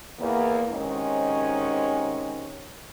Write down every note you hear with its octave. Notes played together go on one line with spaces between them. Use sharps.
E2 A#3
G#2 C3 D#3 G#3 C#4 C#5